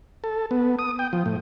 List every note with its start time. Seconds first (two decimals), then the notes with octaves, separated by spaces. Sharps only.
0.24 A4
0.51 B3
0.79 D#6
0.99 G5
1.13 F3
1.26 A2